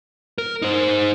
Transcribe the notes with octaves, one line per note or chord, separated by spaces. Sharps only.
A#4
D#4 C5